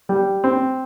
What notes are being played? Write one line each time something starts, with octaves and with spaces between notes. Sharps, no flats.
G3
C4